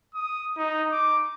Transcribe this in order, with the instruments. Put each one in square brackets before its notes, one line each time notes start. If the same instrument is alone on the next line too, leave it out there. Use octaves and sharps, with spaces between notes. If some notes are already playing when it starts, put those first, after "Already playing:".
[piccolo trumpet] D#6
D#4
D6